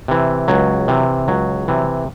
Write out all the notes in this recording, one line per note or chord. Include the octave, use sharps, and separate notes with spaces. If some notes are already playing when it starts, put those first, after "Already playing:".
C3 E3
C#2 F#3
C3 E3
C#2 F#3
C3 E3